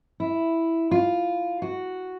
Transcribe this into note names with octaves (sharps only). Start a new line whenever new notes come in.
E4
F4
F#4